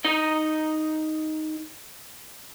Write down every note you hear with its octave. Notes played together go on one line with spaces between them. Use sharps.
D#4 D#5